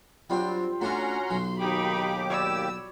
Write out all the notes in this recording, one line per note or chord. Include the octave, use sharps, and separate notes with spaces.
F#3 G3 C4 D4 F4 G5
A3 C#4 D4 F4 F#4 F#5 A#5 C6
B1 F#3
D#2 D#4 G4 B5 D6
C#5 D5 B5 E6